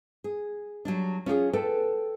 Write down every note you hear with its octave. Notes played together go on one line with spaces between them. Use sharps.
G#4
F#3 G3 D4
C#4 F4 G4 G#4
A4 B4 G5 A5